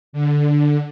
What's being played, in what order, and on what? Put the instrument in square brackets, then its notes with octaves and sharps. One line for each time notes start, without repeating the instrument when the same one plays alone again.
[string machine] D3